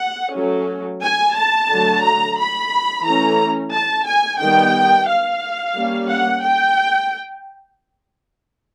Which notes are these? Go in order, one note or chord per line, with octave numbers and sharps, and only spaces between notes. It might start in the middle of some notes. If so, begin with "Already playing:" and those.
Already playing: F#5
F#3 A3 C#4
G#5
A5
D3 F#3 A3
A#5
B5
E3 A3 C#4 A#5
A5
G#5
D#3 G3 B3 G5
F5
G3 A#3 C#4
F#5
G5